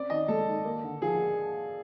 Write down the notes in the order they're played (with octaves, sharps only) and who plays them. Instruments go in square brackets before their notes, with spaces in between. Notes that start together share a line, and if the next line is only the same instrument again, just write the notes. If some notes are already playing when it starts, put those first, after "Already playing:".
Already playing: [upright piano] C4 C#4 [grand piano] D5
[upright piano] D#3 [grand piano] D#5
[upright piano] G#3 [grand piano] A4
[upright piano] D#3
A#3
D3
[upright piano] F3 [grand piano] G#4